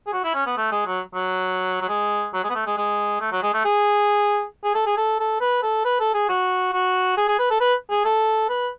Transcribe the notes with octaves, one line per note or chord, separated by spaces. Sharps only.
G#4
F#4
E4
C#4
B3
A3
G#3
F#3
F#3
F#3
G#3
F#3
G#3
B3
A3
G#3
G#3
A3
F#3
G#3
A3
G#4
G#4
A4
G#4
A4
A4
B4
A4
B4
A4
G#4
F#4
F#4
G#4
G#4
B4
A4
B4
G#4
A4
B4